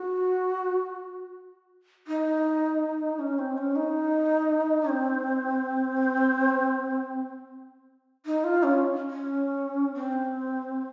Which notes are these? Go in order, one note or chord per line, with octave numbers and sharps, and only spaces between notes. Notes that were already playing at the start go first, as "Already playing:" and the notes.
Already playing: F#4
D#4
C#4
C4
C#4
D#4
C4
D#4
F4
C#4
C#4
C4